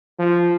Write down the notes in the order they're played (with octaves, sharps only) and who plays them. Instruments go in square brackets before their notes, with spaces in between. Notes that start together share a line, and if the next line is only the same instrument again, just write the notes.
[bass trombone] F3